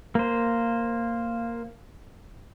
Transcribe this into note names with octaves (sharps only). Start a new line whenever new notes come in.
A#3 C5